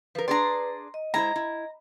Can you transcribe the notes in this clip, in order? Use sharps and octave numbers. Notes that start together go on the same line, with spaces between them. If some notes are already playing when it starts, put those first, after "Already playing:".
F3 A#4 B4
D4 G#4 D5 A#5 C6
D#5
G#3 E4 C5 A#5
E4